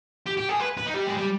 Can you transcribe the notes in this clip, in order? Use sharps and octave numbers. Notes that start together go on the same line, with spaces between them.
G4
G4
G#4
B4
B4
D#4
G3
G#3
G3